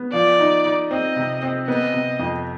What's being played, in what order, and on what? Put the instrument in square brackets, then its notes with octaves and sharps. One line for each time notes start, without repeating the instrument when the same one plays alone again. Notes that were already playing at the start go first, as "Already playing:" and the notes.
Already playing: [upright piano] B3
[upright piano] F3 [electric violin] D5
[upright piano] D#4
D#4
[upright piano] C4 [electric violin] D#5
[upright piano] C3
C4
[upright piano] B3 [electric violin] D#5
[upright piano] C3
F2